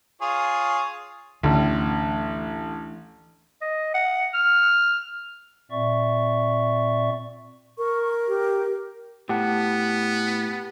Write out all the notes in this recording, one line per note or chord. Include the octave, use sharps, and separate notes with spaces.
F4 G#4 C#5
A1 D2 D3 E3 A3 D4
D#5
F#5
F6
A#2 C4 D5 E5 C#6
A#4 C#6
G4
A2 B3 G4 F#5 A5